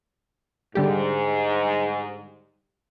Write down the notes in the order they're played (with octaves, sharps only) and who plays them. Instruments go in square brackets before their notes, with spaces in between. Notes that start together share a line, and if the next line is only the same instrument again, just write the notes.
[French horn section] G#2 [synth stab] D3 G3 G4